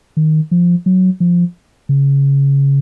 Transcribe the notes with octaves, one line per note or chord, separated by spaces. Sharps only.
D#3
F3
F#3
F3
C#3